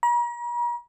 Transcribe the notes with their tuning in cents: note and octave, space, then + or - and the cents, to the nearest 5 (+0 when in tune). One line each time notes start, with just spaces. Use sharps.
A#5 +45